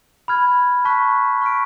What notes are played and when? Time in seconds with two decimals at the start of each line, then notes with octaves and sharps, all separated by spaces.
0.28 B5 F6 G#6
0.85 A5 C#6 F#6 B6
1.42 C#6 F6 B6 D7